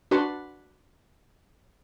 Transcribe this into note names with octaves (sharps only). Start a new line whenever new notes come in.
D4 F#4 B4 F#5 A5 C6